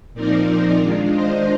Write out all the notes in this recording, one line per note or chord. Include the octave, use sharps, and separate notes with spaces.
A#2 F3 C4 D#4 A#4 D5
D#3 G#3 D4 F4
C5 D#5